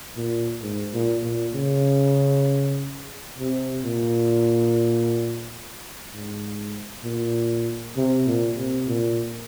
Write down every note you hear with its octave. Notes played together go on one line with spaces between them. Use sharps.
A#2
G#2
A#2
A#2
C#3
C3
A#2
G#2
A#2
C3
A#2
C3
A#2